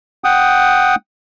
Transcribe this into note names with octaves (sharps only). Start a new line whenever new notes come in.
F#5 G5 D#6